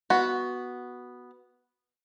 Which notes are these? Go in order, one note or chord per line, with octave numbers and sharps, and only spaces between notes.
B3 F#4